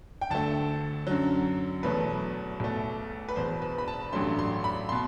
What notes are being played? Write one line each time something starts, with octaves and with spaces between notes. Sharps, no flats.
G5
D2 D3 A3 A5
F#2 D3 F#3
E2 B2 F#3 A3 B4
B1 B2 A3
B4
E1 E2 B2 C5
B4
B5
A5
A1 G2 F#3 A3 C6
C6
B5
B2 C6